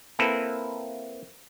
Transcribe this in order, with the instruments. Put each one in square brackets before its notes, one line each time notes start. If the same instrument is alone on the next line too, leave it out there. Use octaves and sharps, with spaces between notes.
[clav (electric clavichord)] A#3 C4 E4 A4 B4